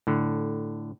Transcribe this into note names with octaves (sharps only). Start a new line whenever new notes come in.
A2 D3